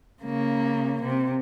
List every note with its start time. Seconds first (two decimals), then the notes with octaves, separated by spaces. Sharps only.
0.23 C#3 A#3
1.02 C3